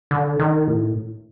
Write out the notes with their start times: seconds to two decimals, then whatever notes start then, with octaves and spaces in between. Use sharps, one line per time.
0.11 D3
0.40 D#3
0.68 A2